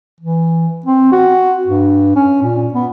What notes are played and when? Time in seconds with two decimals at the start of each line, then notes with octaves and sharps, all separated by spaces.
0.20 E3
0.86 C4
1.12 F#4
1.67 G2
2.16 C#4
2.42 A#2
2.74 B3